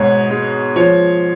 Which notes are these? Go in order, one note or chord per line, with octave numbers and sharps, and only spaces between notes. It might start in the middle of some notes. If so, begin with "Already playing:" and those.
Already playing: G#2 B2 C#5
G#3
F3 C#5